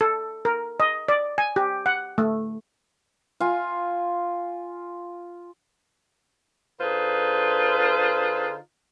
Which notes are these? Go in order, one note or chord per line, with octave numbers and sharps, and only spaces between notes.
A4
A#4
D#5
D5
G#5
G4
F#5
A3
F4 G#5
D3 D#4 F4 G#4 B4 C5